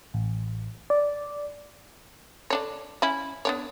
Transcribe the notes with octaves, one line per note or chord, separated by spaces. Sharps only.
A1
D5
D3 D4 C#5
C#4 E4
B3 D4 C#5